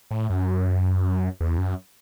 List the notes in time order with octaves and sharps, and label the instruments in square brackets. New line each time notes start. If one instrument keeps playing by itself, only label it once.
[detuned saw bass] A2
F#2
E2
F#2